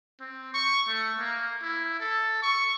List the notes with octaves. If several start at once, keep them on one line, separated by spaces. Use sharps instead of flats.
C4
C#6
A3
A#3
E4
A4
C#6